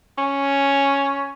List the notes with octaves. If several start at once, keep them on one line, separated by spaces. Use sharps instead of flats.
C#4